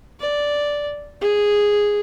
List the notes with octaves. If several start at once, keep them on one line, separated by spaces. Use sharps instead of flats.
D5
G#4